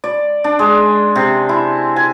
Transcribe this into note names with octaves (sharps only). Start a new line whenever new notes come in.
D5
D4
G#3
C3
E4
G#5